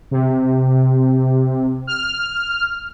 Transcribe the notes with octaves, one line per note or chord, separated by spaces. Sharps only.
C3
F6